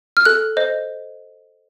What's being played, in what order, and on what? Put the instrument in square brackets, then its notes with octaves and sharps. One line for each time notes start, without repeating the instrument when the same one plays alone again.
[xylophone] F6
A4 F#6
C5 D#5